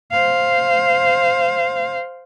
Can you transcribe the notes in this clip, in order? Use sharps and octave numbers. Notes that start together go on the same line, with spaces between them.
C5 F5